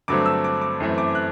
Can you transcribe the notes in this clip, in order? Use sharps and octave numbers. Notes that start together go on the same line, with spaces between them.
G2 D3 F#3 A3 C4 D6
E6
D6
D6
F#2 E3 A3 C4
D6
F#6